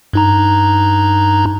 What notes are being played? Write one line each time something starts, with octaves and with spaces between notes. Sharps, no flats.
G2 D#4 A#5